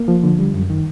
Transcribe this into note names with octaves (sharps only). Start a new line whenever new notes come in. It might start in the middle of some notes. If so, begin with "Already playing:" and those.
Already playing: A#3
F3
D3
G3
F#2
D#3